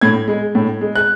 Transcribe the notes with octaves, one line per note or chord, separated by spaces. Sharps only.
A2 G#6
G#3
A2
G#3
F#6